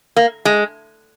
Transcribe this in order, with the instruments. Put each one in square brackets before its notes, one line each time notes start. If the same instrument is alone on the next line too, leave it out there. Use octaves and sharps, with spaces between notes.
[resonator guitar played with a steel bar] A#3
G#3